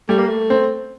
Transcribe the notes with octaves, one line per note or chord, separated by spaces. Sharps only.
G3 A3
A#3
A3
C4